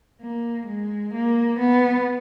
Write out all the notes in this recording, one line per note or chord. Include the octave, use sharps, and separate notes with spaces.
A#3
G#3
A#3
B3